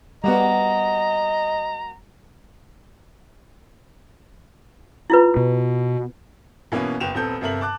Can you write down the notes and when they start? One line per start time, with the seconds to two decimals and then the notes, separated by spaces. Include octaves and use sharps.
0.24 G3 A#3 B3 F#4 D#5 A#5
5.10 E4 F4 B4
5.37 B2
6.72 B2 E3 A#3 B3 C#4
7.00 F#1 B3 G5 E7 F7
7.15 D#1 B3 C4 A4 G6
7.41 G1 C3 A4 A#4 E5 F#7
7.61 A5 D6 F#6